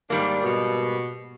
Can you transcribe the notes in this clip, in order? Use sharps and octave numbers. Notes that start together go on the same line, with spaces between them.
G#2 D#3 G3 A#3 D4
B2